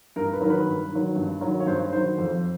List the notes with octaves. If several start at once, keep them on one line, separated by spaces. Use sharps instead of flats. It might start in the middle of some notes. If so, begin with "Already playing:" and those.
G2 A#4
B4
D#3 F#3 A#4
B4
G2
D#3 F#3
G2
D#3 F#3
C#5
G2 C5
D#3 F#3 C5
F2